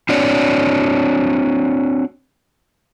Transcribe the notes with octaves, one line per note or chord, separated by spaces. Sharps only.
C4 D4 F#4 C#5 D5